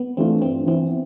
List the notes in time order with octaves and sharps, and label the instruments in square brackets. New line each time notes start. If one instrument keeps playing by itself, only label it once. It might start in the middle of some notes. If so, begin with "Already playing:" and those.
Already playing: [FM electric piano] B3
[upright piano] E3 A3 D4 F4 [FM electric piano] C4
[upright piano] G2 [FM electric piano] C4
[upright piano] E3 B3 E4 [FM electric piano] C4